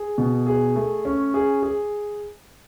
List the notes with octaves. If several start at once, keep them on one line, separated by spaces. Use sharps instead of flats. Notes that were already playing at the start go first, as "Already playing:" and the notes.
Already playing: G#4
B2
G#4
A3
C#4
G#4
G#4